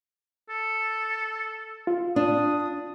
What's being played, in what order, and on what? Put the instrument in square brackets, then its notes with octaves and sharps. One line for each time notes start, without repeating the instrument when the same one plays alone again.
[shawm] A4
[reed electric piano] F4
[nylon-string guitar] D4 [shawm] D#6